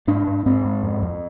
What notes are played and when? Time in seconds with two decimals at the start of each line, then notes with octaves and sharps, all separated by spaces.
0.07 G#2 D4
0.27 G#2
0.46 G#2 C4
0.65 G#2
0.82 F2
1.02 F2